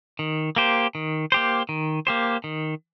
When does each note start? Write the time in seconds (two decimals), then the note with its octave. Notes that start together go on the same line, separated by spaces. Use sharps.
0.19 D#3
0.56 A#3 G4 C5
0.95 D#3
1.32 A#3 G4 C5
1.69 D#3
2.07 A#3 G4 C5
2.44 D#3